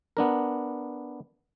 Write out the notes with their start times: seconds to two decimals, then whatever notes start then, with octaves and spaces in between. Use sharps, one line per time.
0.17 B3 D4 A#4